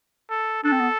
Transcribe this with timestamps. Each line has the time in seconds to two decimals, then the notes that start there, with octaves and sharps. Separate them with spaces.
0.30 A4
0.64 D4 A4
0.72 C4
0.80 B3